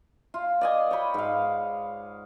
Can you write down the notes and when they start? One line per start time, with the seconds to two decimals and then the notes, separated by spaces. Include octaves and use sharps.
0.34 F4
0.61 D5 D#5 G#5
0.91 C#5 G5 B5
1.14 G#2 F5